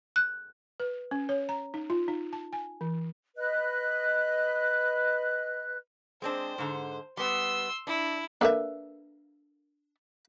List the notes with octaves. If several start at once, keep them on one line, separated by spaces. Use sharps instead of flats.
F#6
B4
C#4
C#5
A#5
D#4
F4
D#4
A5
G#5
E3
B4 D#5 F#6
G#3 C4 D4 C5
G#2 D3
G3 B3 C6 E6
D4 E4
A#3 D4 A4 B4 E5